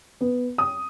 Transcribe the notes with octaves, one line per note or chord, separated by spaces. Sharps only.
B3
D#6